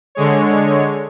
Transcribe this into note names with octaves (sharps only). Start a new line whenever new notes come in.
D3 G#3 C#5